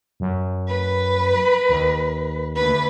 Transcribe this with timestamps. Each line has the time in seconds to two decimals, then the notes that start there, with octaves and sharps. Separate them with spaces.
0.20 F#2
0.68 B4
1.69 D#2
2.56 D2 B4